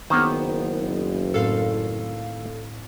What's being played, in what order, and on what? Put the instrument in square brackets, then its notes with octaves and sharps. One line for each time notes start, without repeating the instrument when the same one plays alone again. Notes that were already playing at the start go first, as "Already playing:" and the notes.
[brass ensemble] F#1 [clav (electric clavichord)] D#3 A#3 [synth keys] B3 C5
[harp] A2 C4 [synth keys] A4 F5